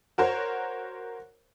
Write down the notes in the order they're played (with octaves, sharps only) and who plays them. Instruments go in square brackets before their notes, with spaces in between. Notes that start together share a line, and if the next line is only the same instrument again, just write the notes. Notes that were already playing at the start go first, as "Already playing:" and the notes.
[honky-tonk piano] F#4 A#4 C5 C#5